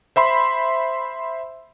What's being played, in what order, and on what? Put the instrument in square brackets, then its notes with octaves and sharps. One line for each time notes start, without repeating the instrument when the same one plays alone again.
[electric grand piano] C5 E5 B5 C6